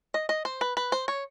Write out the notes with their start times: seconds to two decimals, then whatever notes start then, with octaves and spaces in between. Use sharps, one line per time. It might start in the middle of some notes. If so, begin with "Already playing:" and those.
0.14 D#5
0.29 D#5
0.45 C5
0.61 B4
0.77 B4
0.92 C5
1.08 C#5